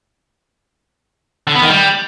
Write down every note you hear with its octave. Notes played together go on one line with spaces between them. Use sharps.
D3
B3
D#3
G3